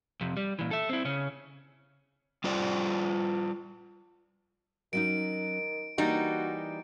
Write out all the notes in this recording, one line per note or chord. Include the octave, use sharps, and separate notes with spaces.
F2 C3
G3
A#2 E3
A4 E5
C4 E4
C#3 C#4
G3 F4 C5 D5
D#3 F#3 C#4 D#4 D7
E3 G3 A#3 D#4 F#4